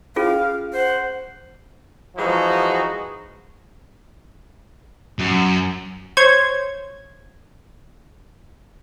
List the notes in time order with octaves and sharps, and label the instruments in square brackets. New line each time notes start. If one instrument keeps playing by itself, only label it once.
[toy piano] C#4 F4 G#4 [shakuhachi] F5
[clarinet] C5 [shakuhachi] F#5
[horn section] E3 F3 G#3 D#4 F#4
[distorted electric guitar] F#2
[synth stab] C5 C#5 G#6